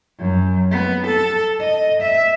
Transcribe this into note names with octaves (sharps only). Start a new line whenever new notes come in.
F#2
B3
A4
D#5
E5